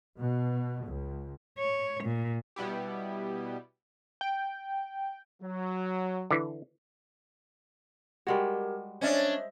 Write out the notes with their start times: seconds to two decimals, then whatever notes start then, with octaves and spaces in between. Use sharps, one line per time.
0.19 B2
0.87 C#2
1.59 C#5
2.04 A#2
2.56 B2 G3 B3 E4 G4
4.21 G5
5.42 F#3
6.31 D3 E3
8.27 G3 G#3 F#4 G4 A#4
9.01 C#4 D4 C5 D#5 E5